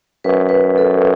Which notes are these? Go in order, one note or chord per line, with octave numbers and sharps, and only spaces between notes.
F#2 B4
B4
A4